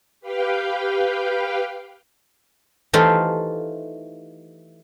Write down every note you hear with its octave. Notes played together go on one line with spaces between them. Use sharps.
G4 B4 F5 G5
E3 A3 D#4 F4 G4 C5